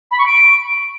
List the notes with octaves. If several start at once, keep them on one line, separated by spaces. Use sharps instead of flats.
B5
C#6
D7